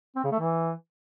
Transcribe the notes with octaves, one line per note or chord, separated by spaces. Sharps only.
C4
C#3
A3
E3